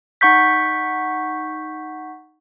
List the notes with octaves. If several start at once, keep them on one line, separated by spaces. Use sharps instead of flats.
D#4 F#5 C#6 G6 B6